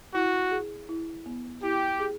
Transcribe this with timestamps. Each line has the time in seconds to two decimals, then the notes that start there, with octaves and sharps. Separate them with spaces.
0.15 E4 F#4
0.51 G#4
0.89 E4
1.26 B3
1.63 E4 G4
2.00 G#4